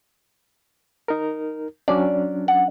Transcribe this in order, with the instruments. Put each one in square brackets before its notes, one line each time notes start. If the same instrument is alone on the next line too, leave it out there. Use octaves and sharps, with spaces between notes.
[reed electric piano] D#4 A#4
[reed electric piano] F#3 C#4 D4 [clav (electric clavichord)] D5
[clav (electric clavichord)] F#5